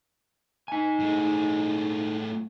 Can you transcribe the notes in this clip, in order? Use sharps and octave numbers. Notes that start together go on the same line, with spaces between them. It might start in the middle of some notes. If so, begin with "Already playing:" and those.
D#4 G#5
A2 G#3